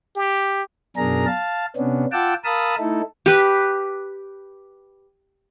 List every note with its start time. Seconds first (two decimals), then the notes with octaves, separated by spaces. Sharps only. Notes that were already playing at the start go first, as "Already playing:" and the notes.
0.16 G4
0.97 F#2 B2 D4 G#4 A#4 A#5
1.26 F5 A5
1.77 C3 B3 C#4 D4
2.12 F4 F#5 G5 A5 D6 E6
2.44 A#4 F5 A5 B5 D#6 E6
2.79 A3 D#4 E4 A4
3.26 G4 B4